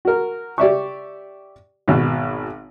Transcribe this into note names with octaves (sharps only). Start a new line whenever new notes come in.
F#4 A#4
G4 D5 E5 C#6
G#1 B2